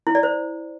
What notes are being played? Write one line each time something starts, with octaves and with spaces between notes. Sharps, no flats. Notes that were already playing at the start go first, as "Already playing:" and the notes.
E4
D5
C5